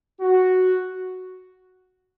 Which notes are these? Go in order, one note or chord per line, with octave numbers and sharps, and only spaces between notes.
F#4